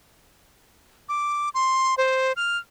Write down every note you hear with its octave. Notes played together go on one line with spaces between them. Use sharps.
D6
C6
C5
F6